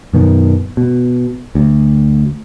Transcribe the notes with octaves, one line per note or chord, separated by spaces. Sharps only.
F#2 B2 D#3
B2
D2